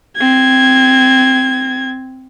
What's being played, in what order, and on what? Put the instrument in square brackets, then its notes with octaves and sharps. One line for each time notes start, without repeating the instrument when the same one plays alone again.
[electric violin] C4 G#6